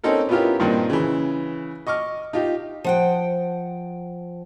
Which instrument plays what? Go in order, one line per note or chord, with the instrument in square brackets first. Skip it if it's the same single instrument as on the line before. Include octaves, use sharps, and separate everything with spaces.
[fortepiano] C4 C#4 D#4 A4 A#4
B3 C#4 E4 F4 G4 A#4
G2 A#2 D#3 C4
C#3 E3
D#5 C#6 D6 F6
D#4 F4 G4
[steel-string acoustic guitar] F3 F#5 G5